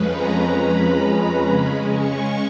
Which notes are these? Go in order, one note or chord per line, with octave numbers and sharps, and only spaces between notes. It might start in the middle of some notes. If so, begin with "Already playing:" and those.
Already playing: F2 F3 G#3 C#4 B4
A#5
B5
B5
C#3 G#3 C#4
C#6